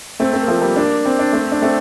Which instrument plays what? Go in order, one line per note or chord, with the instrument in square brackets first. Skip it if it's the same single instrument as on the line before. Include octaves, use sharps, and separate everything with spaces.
[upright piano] A3 C4
A3 C4
A#3
F3 A3
G3 A#3
A#3 D4
C4
D4
A3 C4
D4
A3 C4